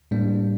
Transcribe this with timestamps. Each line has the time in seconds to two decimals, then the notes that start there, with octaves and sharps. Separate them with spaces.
0.11 A2 G3 A#3 D4